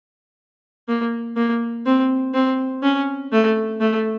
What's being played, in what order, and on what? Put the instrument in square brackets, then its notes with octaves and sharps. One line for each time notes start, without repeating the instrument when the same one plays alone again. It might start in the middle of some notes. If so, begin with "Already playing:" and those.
[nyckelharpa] A#3
A#3
C4
C4
C#4
A3
A3